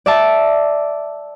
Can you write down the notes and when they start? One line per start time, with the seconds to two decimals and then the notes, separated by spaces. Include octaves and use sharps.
0.06 D5 E5 A5